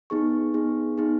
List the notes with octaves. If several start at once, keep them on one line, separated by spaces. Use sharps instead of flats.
B3 D#4 G#4 C#6
B3 D#4 G#4
B3 D#4 G#4